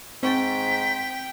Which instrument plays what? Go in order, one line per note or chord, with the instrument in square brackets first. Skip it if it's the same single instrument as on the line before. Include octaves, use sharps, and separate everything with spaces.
[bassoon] G#2 [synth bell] C4 C#6 A6 [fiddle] G5 [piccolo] B6